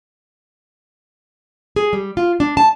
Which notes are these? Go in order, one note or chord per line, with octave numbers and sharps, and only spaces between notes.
G#4
G3
F4
D4
A5